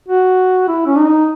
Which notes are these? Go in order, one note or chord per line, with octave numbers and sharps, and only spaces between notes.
F#4
E4
C#4
D#4